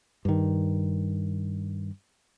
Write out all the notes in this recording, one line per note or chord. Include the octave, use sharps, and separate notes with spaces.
G2 D#3